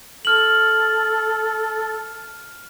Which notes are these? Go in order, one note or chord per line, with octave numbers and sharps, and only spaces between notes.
A4 F6 F#7